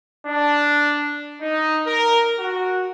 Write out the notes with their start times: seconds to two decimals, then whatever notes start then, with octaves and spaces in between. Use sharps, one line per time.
0.26 D4
1.42 D#4
1.86 A#4
2.40 F#4